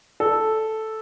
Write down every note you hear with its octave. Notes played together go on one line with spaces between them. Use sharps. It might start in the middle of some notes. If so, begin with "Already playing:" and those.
A4